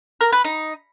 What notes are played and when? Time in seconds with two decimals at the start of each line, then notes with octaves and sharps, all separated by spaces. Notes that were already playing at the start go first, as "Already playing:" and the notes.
0.21 A#4
0.33 B4
0.44 D#4